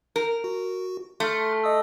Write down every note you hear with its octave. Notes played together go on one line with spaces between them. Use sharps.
A#4
F#4
A3 C6 F6
D#5 D#6 E6